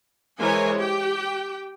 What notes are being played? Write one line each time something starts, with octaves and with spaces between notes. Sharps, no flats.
E3 G#3 A#4 C5 C#5 G#5
G4 G5